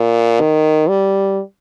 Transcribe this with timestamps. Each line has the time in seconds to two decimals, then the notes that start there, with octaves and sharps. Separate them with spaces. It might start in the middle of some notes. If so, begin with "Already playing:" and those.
Already playing: A#2
0.40 D#3
0.89 G3